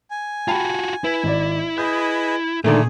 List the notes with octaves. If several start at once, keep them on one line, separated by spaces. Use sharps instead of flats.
G#5
F4 F#4 G5 A5 B5
E4 B4
G#1 D5
G#4 B4 D#5 G6
A#2 D3 D#3 A3 G#4